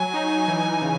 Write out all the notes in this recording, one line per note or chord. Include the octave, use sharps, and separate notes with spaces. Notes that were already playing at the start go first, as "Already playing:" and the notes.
Already playing: F#3 G#5
D#4
E3
C#3